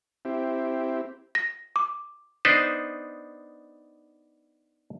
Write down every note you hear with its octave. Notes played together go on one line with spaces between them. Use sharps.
C4 E4 G4
A#6
D6
B3 D4 D#4 B4 C5